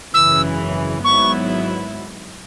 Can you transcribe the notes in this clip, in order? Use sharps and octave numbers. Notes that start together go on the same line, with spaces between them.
G#1 F#2 C#3 E3 E6
G#1 G#2 F#3 B3 E4 C#6